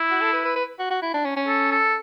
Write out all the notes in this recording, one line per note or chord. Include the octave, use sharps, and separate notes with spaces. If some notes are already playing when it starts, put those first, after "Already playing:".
Already playing: E4
F#4
A4
B4
B4
B4
F#4
F#4
E4
D4
C#4
C#4
A4
A4